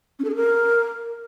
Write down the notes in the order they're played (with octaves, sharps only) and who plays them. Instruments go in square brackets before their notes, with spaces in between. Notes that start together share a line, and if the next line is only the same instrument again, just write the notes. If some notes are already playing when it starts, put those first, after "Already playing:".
[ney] C#4
A4
G#4
A#4